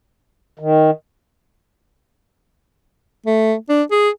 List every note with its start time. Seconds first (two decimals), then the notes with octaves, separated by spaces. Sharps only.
0.59 D#3
3.26 A3
3.69 D4
3.91 G#4